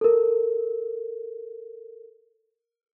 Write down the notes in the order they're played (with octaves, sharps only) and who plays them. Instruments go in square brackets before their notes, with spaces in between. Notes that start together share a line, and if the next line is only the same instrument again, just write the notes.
[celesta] A4 A#4